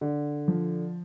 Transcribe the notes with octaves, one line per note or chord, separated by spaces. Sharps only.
D3
F3